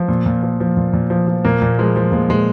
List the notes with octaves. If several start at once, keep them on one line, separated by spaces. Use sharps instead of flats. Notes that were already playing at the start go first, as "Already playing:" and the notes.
Already playing: F3
A#2
A#2
F3
F3
A#2
A#2
F3
F3
A#2 A#3
A#2
F3 G#3
F3
A#2 G#3
A#2 G#3